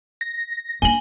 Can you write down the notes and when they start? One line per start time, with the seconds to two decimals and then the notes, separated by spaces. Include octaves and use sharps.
0.21 A#6
0.82 A#3 D4 G#5 F#7 G7